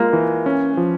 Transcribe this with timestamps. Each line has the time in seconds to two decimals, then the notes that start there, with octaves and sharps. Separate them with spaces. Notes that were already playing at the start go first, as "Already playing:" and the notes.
Already playing: G#3 A#3 F4
0.13 E3
0.46 C#4
0.77 F3